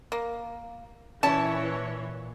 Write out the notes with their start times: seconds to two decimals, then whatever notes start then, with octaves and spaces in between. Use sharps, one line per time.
0.12 A#3
1.23 A#2 E3 C#4 E4 C#5 A5